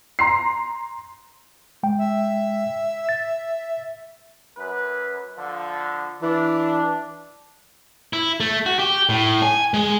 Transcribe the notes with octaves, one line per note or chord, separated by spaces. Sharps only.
A#5 C6 C7
G#3 G5
E5
A6
F#2 B4
D3 F3
E3 D4
E4
A3
F#4
G4
A2
G#5
G#3